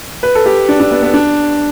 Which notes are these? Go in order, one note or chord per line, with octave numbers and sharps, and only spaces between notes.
B4
A4
G4
D4
D4
B3
B3
D4